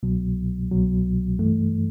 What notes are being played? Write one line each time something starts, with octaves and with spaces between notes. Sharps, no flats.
C2 B2 F#3
C2 B2 F#3
G2 E3 A3